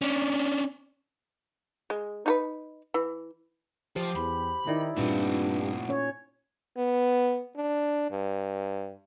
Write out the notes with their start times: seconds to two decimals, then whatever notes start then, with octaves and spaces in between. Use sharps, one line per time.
0.01 C#4 D4
1.90 G#3
2.26 D#4 A4 B4
2.94 E3
3.96 F3 F4 G4 C5
4.16 E2 B5
4.66 D#3 D#4 E4 D5
4.96 G2 A#2 A3 C4 F4
5.89 C#4 C#5
6.77 B3
7.56 D4
8.11 G2